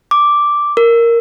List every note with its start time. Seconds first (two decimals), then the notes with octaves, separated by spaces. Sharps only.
0.11 D6
0.77 A#4